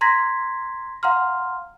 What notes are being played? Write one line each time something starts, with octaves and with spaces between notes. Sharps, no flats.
A#5 C6 G#6 A#6 B6
F5 F#5 A#5 C6 F6